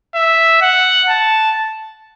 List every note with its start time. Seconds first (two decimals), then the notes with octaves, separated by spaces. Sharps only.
0.15 E5
0.62 F#5
1.10 A5